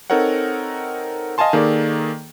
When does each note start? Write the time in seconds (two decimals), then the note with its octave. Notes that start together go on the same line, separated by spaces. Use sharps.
0.10 C4 D#4 A4 A#4 C#5 F#5
1.38 D#5 F5 G#5 A5 C6
1.53 D#3 A#3 G#4 A4 D5